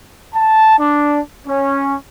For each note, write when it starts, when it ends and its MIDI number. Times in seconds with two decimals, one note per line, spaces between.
0.33 0.74 81
0.79 1.20 62
1.46 1.94 61